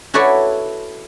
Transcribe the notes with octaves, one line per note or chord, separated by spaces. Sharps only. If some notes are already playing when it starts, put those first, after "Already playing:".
E4 F#4 A4 B4 C#5 D5